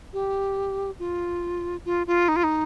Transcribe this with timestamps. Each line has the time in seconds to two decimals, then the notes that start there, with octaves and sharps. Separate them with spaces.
0.13 G4
0.99 F4
1.85 F4
2.07 F4
2.28 D#4
2.36 F4
2.44 D#4